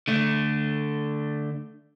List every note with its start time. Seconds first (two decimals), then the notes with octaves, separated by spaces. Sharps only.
0.08 D3 A3